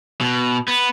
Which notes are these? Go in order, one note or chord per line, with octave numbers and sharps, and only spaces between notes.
B2
B3